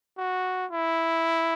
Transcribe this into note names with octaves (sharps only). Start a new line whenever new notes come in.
F#4
E4